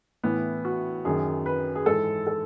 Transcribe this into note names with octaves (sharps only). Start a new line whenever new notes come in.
A2 E3 B3
F#4
F#2 D#3 G#4
B4
G#4
G#2 E3 A4
A4